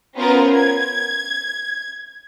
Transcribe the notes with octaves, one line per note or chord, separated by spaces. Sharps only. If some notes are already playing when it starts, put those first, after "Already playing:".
B3 C#4 F4 A#4 C5 A#5
G#6